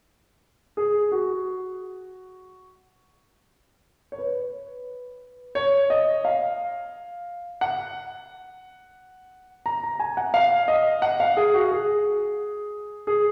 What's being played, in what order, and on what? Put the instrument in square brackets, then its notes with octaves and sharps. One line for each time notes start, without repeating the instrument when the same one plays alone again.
[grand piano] G#4
F#4
C#5
B4
C#5
D#5
F5
F#5
A#5
A#5
G#5
F#5
F5
D#5
F#5
F5
G#4
F#4
G#4
G#4